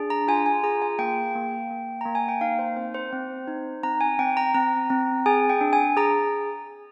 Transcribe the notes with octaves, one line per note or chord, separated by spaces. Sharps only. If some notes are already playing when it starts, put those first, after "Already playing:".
Already playing: D4 G#4
A#5
F4 G#5
G#5
G#4 A#5
G#5
A#3 G5
A#3
A#3
A#3 A#5
G#5
G5
D#4 F5
C5
C4 C5
C5
C4
D#4
C4 A#5
G#5
C4 G5
A#5
C4 A#5
C4
G#4 G#5
G5
D4
G#5
G#4 A#5